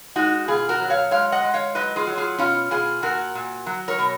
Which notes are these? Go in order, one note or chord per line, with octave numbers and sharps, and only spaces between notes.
G#3 D#4 F#4
B2 F4 G#4
F#4 A#4
F#3
C#5 F5
G#3 C#5 F5
D#5 F#5
G#3
C#5 F5
F#3 B4 D#5
F4 G#4
F#3
F4 G#4
B2 C#4 F4
B2 F4 G#4
A#2 F#4 A#4
A#2
F#3
A#4 C#5
B2